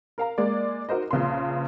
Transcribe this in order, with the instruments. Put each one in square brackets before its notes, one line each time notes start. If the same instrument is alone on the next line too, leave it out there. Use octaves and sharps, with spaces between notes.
[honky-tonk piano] A#4 F5 A#5
G#3 A#3 D5
D#4 F#4 A#4 C5 D#5
A#1 C#3 B4 C6